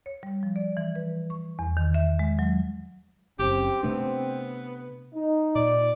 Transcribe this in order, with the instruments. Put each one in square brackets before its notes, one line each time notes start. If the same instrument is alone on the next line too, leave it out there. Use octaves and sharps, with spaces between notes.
[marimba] C#5
G3
F3
D5
E3
B4
C#6
E2
D#3
E5
G#3
F#3
[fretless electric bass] F#1 F#2 [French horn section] C4 [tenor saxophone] G4
[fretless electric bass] C3 A3 D4 [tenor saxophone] B3
[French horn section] D#4
[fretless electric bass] A#2 [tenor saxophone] D5